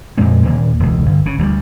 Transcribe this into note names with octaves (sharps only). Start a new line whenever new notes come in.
F2 A#2 G#3 C4
D#2 A#2 A#3
E1 C#2
G1
C#3
D2 D#3 G3